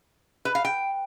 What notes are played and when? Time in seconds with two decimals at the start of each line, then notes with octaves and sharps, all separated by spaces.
0.45 B4
0.55 F5
0.65 G5